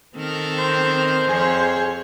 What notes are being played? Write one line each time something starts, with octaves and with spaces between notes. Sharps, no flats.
D#3 C4 A4 A#4
C5
F2 G#4 C#5